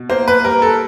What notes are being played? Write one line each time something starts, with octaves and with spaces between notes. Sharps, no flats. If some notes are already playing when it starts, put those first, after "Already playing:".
Already playing: B2
A#3 C5
B4
G3 A#4
A4